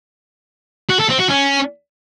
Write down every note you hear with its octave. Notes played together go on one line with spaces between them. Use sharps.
F#4
A4
C4
F#4
C#4